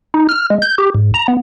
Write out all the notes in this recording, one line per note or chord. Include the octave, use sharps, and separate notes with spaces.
D#4
F6
G#3
G6
G4
G#2
A#5
B3